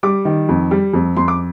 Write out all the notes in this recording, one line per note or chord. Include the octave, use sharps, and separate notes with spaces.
G3 D6
D#3
F2
G3
F2
F2 C6
D6